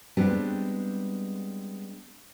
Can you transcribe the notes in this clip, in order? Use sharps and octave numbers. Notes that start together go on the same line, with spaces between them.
G3 G#3 B3 C4 D4 B4